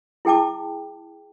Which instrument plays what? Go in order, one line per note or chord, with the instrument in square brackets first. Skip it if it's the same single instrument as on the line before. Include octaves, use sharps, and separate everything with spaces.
[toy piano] E4 G#4 G5 A5 D6